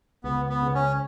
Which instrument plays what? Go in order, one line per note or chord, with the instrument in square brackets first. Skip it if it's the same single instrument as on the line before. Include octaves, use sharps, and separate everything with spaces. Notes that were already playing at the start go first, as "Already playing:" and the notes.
[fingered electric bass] C#2 [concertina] B3
[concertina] B3
[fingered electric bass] C#3
[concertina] C#4